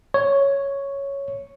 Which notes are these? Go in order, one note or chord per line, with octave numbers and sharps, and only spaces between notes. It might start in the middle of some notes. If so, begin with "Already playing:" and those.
C#5